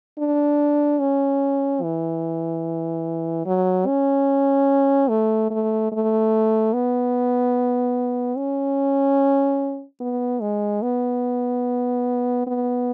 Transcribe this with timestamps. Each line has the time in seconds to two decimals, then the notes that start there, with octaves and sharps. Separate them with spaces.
0.19 D4
1.00 C#4
1.83 E3
3.46 F#3
3.87 C#4
5.09 A3
5.50 A3
5.92 A3
6.73 B3
8.37 C#4
10.01 B3
10.41 G#3
10.82 B3
12.47 B3